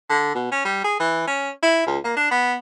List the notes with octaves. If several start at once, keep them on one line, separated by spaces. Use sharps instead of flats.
D3
B2
C#4
G3
G#4
E3
C#4
E4
C#2
A#3
D4
B3